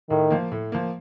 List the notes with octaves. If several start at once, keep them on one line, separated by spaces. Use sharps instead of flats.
A2 D#3
F3 A#3
A2
F3 A#3